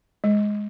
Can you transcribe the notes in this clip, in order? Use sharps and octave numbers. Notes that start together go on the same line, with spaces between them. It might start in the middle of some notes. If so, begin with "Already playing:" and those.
G#3